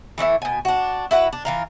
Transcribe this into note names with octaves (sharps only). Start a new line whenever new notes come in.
E3 A3 C#4 E4
B2 G#5
D4 F#4
E4 F#4 B4
D4
E3 F4 A#4